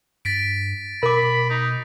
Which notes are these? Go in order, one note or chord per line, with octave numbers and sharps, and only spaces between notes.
G2 A6 B6 D7
B2 A#4 B5 D6
D#4